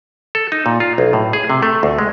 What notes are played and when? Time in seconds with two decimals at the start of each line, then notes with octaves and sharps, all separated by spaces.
0.35 A4
0.52 D#4
0.66 A#2
0.80 F4
0.98 B1
1.13 A2
1.33 G#4
1.50 C3
1.62 A3
1.83 D2
1.98 G#3